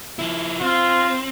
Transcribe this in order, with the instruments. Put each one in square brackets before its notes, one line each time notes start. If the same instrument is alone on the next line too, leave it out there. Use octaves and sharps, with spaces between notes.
[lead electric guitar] F3 E4
[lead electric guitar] C4 [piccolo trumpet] F4